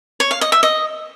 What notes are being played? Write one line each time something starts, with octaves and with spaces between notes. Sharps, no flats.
C#5
F5
D#5
E5
D#5